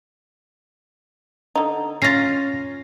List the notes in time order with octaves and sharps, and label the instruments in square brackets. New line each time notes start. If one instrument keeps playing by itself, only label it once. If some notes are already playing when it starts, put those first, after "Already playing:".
[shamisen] D3 D#4
[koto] C#4 F4 [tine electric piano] A6 A#6 C7